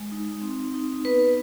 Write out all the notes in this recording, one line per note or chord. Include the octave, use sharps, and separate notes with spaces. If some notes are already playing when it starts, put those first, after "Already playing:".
Already playing: G#3
D#4
C4
D#4
B3 B4